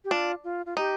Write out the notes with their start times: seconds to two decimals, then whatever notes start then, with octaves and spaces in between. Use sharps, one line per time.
0.05 G4
0.11 D4 F4
0.44 F4
0.66 F4
0.77 D#4 G4